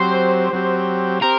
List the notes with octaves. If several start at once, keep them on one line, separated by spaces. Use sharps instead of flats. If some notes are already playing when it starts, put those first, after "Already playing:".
Already playing: F#3 C4 G4 C5
F#3 C4 G4
C4 G4 A#4